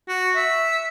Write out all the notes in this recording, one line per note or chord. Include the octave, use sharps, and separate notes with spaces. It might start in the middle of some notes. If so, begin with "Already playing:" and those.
F#4
E5